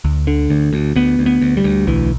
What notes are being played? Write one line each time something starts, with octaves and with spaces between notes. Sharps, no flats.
D2
D3
D2
D2
D2 B3
D2
B3
D2
G3
D2
B1 E3